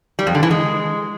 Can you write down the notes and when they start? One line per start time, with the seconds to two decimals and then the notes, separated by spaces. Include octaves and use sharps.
0.19 G3
0.27 F2
0.35 D3
0.43 E3
0.51 G#3